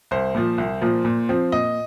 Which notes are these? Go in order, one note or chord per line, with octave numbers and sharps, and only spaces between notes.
C2 C5
A#2 F3
C2
A#2 F3
A#2
F3 C4
A#2 D#5